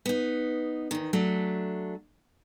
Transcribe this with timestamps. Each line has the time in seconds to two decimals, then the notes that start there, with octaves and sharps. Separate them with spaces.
0.06 B3 D#4
0.91 E2 D#3
1.13 F#3 A3 D4